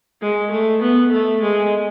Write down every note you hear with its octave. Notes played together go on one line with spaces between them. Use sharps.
G#3
A3
B3
A3
G#3